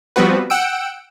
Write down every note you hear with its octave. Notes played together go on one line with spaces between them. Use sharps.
F3 G3 B3 C4 F#4 B4
F#5 G5 E6 D7